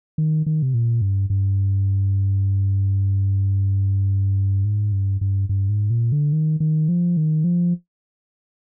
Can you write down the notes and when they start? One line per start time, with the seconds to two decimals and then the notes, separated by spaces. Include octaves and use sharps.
0.18 D#3
0.46 D#3
0.62 C3
0.74 A#2
1.01 G2
1.30 G2
4.65 G#2
4.92 G2
5.21 G2
5.49 G2
5.69 G#2
5.90 A#2
6.12 D3
6.33 D#3
6.60 D#3
6.89 F3
7.17 D#3
7.44 F3